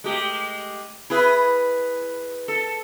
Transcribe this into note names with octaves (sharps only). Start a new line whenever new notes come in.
G#3 A3 G4
E4 G#4 B4
A4